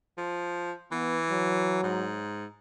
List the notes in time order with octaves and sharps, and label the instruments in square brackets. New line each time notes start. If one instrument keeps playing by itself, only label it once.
[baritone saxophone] F3
[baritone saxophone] E3 [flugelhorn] B3
[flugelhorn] F#3
[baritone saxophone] G#2